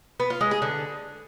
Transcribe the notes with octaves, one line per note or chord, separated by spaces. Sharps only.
B3
F4
G#3
G#4
D3